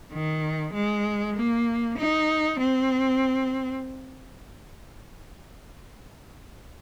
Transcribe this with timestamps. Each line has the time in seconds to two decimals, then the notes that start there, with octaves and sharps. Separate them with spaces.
0.13 D#3
0.74 G#3
1.36 A#3
1.98 D#4
2.60 C4